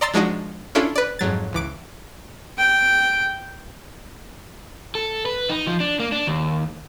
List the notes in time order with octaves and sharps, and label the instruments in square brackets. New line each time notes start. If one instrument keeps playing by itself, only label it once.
[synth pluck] D5 D#5 A#5 C6 E6 A6
F3 G#3 D4 D#4 F#4 D#5
C#4 D4 E4 F4 A4
B4 D5
F2 G#2 F#3 A6
C#2 E3 D6 D7
[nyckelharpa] G5
[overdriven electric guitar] A4
B4
D#4
F3
D4
A#3
D4
D#2